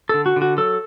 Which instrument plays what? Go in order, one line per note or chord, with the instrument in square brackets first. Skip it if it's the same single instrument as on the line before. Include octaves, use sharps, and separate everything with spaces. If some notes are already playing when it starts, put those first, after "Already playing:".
[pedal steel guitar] D3 A4
F#4
D3
F#4
F#3 A4